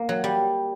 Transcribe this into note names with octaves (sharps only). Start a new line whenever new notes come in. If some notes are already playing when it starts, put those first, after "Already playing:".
Already playing: A#3
F#3
G3